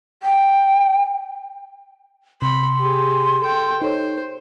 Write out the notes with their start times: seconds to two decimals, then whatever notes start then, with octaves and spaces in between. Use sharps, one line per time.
0.23 G5
2.42 C3 B5 C6
2.79 G4 G#4
3.40 A4 G5
3.82 D#4 A4 C5 C#5